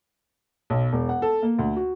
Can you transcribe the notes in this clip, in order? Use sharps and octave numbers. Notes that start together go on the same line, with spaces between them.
B1
E1
F#5
A4
A#3
D2
F#4